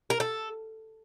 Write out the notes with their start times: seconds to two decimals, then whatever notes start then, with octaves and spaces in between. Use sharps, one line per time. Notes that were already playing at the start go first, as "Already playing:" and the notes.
0.10 A#4
0.20 A4